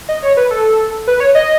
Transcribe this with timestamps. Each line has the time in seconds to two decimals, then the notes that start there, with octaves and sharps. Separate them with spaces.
0.09 D#5
0.23 C#5
0.37 B4
0.51 A4
1.07 B4
1.20 C#5
1.35 D#5